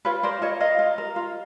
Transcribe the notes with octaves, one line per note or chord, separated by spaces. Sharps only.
F4 B4 C#5
A#4 C5 D5
F4 C#5 D#5
A#4 D#5 F5
F4
A#4
F4